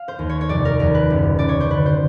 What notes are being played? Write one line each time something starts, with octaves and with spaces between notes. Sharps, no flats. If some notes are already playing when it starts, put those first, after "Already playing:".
Already playing: F5
C5
D#2
C#5
C#5
F1 D5
A#4
D#2 A#4
B4
F#1
F#1 D5
C#5
C5
D3 B4
C5